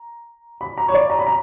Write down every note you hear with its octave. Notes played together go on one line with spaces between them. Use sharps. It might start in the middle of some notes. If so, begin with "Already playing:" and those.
Already playing: A#5
B5
A#5
C#5
D5
A#5
B5
A#5